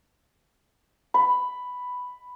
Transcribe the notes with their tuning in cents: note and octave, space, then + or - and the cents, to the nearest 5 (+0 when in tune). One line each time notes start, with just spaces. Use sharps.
B5 +5